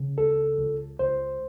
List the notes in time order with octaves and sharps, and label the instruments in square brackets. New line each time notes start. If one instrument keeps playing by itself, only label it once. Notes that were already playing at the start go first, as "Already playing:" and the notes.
Already playing: [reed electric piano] C#3
C#2 A4
C#2
C#2 C5